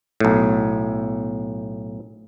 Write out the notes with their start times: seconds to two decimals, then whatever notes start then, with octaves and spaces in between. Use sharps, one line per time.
0.20 B1 A2